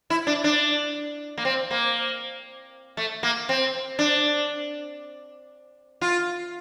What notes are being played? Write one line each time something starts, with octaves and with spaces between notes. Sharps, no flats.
E4
D4
D4
A#3
C4
A#3
A3
A#3
C4
D4
F4